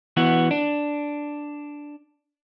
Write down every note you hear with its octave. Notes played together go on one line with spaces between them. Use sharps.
E3 B3 F#4
D4